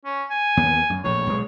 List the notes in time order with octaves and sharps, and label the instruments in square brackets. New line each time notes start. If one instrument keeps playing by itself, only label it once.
[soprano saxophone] C#4
G#5
[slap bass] D#2 B3
F#2
[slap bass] A#1 A2 [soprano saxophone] C#5
[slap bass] B1 G#3